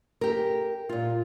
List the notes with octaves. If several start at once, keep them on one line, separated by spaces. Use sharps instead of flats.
G4 A#4
A#2 F4